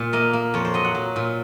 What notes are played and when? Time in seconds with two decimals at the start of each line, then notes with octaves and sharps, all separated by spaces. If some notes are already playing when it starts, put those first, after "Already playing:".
Already playing: A#2
0.13 A#3 D#5
0.33 A#3
0.54 F2 C#5
0.65 C5
0.74 F#3 D#5
0.85 F#5
0.95 F#3
1.16 A#2